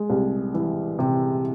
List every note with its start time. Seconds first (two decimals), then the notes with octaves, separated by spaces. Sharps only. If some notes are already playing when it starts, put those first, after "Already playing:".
Already playing: G#3
0.10 C2
0.54 E3
0.99 C3